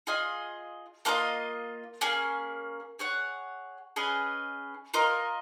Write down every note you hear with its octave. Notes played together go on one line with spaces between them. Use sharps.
F4 G#4 D#5 G#5
A#3 F4 A#4 D#5
A#3 C#4 G#4
G#4 C#5 F#5
C#4 G#4 B4 D#5
F4 A#4 D#5